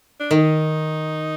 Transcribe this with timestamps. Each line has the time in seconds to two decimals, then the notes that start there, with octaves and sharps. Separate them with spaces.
0.20 D4
0.31 D#3 D#4